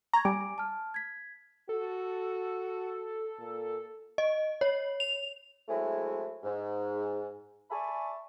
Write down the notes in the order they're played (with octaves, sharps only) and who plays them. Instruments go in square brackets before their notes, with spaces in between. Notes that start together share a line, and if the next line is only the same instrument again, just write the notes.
[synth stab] A#5 [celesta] C#6 G#6
[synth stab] G3 [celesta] G#5 D6 D7
[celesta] A5 F6
G#6 B6
[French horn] F#4 [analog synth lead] A4
[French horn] A#2
[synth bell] D#5
C#5
F7
[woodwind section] F#3 G#3 A3 C4 E4 G#4
G#2
D5 E5 G#5 A5 B5 C#6